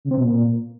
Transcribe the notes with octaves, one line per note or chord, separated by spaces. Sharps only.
C#3
C4
B2
A#2